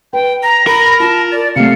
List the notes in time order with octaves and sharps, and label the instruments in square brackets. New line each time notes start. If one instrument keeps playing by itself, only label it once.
[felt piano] B4 [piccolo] G5
[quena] A#5 [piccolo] A#6
[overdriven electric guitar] A#4 [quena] B5
[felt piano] F4 [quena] A5
[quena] D5 [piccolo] A6
[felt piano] C3 A3 [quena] F5 [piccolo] C#7